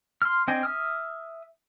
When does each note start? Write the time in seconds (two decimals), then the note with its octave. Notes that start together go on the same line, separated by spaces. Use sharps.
0.22 C6 F6
0.48 C4 D4 D#5 G5 G#5
0.63 E5 D#6 F6